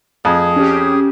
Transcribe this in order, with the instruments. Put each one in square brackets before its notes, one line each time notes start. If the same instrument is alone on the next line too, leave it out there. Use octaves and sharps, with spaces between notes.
[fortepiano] F2 [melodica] G#4
[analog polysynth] C#4 G4